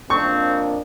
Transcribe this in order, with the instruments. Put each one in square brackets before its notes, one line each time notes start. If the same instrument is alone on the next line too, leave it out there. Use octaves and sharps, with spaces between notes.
[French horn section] F2 A#3 D4 [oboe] C4 [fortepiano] C#6